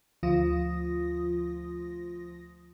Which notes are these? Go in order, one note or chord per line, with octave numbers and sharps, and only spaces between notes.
D2 F3 F4 D#6 A#6